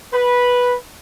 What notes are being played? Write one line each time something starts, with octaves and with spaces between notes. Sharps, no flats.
B4